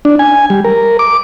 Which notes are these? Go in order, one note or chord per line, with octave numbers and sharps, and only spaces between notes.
D4
G#5
G3
A#4
D6